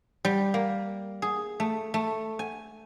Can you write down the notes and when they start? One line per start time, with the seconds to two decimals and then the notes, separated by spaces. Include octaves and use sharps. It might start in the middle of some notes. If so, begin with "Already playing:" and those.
0.25 G3
0.54 A#3
1.22 G#4
1.60 A3
1.94 A3
2.39 G#5